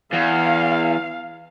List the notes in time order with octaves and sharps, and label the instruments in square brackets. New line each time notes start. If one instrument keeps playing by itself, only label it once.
[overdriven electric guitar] E2 [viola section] F5